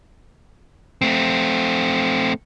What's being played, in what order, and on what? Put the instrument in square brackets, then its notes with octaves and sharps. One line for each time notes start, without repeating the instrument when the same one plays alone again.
[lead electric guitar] A3 C4